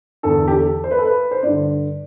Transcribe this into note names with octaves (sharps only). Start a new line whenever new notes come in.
E2 D3 A4
G4
A4
C5
B4
A4
B4
C5
G2 D3 D5